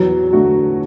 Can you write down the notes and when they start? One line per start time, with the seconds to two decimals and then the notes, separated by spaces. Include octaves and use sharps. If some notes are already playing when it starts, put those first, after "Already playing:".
Already playing: E2 F#3
0.33 D3 A3 F#4